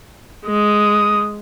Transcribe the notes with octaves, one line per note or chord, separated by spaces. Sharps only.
G#3 D#6